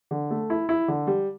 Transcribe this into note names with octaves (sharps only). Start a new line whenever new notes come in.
D3
A3
E4
E4
D3
G3